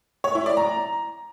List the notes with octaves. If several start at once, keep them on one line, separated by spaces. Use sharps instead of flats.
C#5
E4
D5
A#5